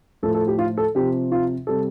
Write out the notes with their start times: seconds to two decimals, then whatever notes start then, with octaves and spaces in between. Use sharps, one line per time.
0.23 A2 F3 A4
0.35 A4
0.48 G4
0.59 F4
0.78 A4
0.95 C3 F3 G4
1.32 F4
1.67 C3 G3 A4